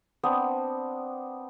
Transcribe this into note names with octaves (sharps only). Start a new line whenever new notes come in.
B3 C4 D4 D#5